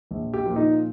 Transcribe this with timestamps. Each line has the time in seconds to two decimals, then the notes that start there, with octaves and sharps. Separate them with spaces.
0.11 A#1
0.34 G4
0.45 A#2 F3
0.56 D#4